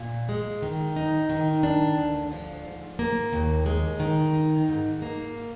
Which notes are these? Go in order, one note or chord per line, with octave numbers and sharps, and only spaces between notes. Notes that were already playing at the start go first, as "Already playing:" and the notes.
Already playing: A#2
G#3
D#3
D#4
D#3
D4
D2
F3
G#2
A#3
D#2
G#3
D#3
D#4
G#2
A#3